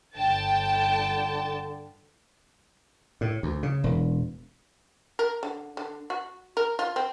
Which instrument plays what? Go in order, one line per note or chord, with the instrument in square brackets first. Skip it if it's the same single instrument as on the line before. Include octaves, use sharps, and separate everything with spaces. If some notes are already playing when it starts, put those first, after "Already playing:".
[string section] G1 G5 A5 [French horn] D3
[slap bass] A2
D2
C#3
E1
[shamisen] A#4
D3
D3
F#4
A#4
F4
C4